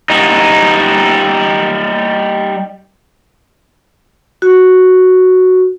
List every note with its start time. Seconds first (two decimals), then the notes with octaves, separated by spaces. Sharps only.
0.10 G3 D#4
4.42 F#4